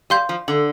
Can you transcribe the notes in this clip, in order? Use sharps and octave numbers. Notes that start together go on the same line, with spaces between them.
G3 F5 C6 G6
F3
D3 A4